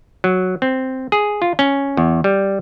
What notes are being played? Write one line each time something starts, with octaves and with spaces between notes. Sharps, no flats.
F#3
C4
G#4
F4
C#4
E2
G3